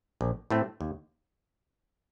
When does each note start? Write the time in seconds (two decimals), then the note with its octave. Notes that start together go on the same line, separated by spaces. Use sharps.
0.21 A#1
0.50 A2 A3 C4
0.81 D#2